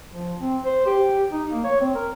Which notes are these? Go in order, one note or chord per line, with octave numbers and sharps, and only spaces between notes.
F3
C4
C5
G4
D#4
A#3
C#5
C4
A#4